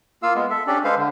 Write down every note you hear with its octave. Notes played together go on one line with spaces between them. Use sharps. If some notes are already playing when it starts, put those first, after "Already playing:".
A#3 F4 F5 E6
G#3 B3
A4 E5
C#4 D4 G4 A4 D5
G#3 A4 B4 C5 F5
D3